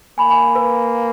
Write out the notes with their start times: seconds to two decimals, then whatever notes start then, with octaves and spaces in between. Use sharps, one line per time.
0.18 A#3 G#5 B5
0.30 G#5 B5
0.55 B4